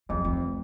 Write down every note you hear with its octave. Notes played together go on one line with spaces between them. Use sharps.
F2 G3
F1 F3